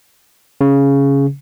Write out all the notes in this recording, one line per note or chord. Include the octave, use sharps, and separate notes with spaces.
C#3